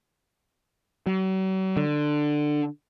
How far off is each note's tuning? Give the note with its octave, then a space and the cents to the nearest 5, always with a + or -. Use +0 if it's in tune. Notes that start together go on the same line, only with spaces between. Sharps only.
F#3 +40
D3 +15